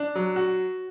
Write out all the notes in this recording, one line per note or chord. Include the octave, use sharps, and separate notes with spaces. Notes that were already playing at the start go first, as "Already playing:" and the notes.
Already playing: D4
F#3
F#4